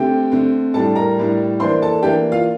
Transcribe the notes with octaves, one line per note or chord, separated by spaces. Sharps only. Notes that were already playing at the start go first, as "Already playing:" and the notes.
Already playing: D3 A3 C4 G4 G5
D3 A3 C4
A2 G3 D4 A4 A5
A#4 A#5
A2 G3 D4
E3 A#3 D4 C5 C6
A4 A5
E3 A#3 D4 G4 G5
F4 F5